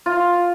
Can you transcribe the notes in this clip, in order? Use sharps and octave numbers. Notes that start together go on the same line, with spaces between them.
F4